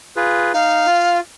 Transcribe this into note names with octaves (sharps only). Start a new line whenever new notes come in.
F4 G#4 B4
D#4 F5
F4